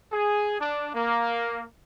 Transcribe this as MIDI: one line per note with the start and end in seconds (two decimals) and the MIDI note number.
0.13 0.60 68
0.60 0.89 62
0.94 1.64 58